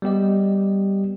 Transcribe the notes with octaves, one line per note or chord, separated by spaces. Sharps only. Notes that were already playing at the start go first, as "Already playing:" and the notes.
G3 B3 G4 D#5